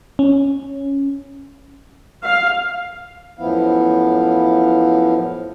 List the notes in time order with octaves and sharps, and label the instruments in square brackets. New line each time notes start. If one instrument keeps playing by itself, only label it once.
[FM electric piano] C#4
[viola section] F5
[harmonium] F#2 A2 F3 B3 E4 F5